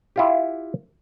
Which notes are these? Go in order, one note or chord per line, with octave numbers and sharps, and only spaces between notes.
E4 F4 G4